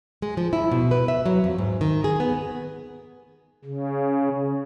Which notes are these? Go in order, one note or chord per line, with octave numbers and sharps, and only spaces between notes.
G#3
F3
E4
B2
B4
E5
F#3
F2
G#2
D#3
G#4
B3
C#3